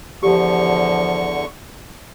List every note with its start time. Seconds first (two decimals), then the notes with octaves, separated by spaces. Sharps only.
0.23 E2 D3 F3 G4 C#6